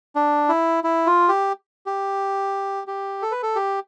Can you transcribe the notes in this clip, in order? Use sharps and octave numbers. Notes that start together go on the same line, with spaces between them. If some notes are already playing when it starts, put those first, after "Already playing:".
D4
E4
E4
F4
G4
G4
G4
A4
B4
A4
G4